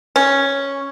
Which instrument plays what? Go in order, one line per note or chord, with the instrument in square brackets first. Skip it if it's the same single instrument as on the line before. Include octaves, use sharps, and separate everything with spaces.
[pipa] C#4